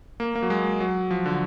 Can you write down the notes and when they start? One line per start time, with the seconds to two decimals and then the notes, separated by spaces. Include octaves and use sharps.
0.20 A#3
0.35 A#3
0.42 F#3
0.50 G#3
0.80 F#3
1.11 F3
1.26 D3